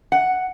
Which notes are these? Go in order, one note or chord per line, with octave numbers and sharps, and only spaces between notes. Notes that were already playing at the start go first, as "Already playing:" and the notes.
F#5